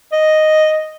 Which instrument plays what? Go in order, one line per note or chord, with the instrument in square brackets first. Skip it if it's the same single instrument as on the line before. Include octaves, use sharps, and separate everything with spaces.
[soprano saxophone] D#5